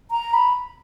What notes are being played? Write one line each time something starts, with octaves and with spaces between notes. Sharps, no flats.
A#5
B5